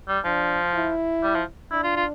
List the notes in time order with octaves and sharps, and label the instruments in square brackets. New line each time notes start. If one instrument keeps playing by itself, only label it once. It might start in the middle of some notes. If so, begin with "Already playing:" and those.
[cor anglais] G3
[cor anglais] F3 [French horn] D4
[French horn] E4
[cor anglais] G3
F3
[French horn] D4 [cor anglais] E4
[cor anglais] F4
F4